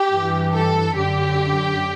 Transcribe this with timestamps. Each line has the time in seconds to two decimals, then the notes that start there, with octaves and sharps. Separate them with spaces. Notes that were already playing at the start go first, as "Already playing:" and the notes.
Already playing: G4
0.11 G2 E3
0.54 A4
0.97 F#2 D3 G4